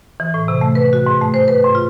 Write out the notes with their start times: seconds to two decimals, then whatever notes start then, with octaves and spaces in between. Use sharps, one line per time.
0.20 E3
0.34 A2
0.48 C3
0.61 A3
0.75 B4
0.93 F#4
1.06 G#2
1.21 A3
1.34 C5
1.48 B4
1.64 G#2
1.75 F4